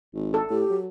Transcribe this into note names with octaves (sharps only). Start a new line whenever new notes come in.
G#1
A4
A2 G4
F#3